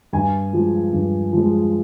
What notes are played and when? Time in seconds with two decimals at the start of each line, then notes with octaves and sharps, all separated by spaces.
0.13 G2 G#5
0.53 F3 G#3
0.93 G2
1.33 F3 G#3